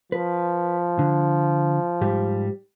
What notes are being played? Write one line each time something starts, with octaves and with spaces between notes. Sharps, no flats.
F3 B4
D3
G#2 G3 G4